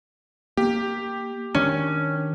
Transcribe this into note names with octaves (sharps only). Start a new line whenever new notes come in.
A#3 G4
D#3 C#4 D4